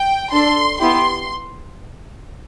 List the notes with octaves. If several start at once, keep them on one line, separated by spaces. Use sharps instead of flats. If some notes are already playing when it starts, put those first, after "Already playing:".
Already playing: G5
D4 A4 C6
B3 E4 G4 C6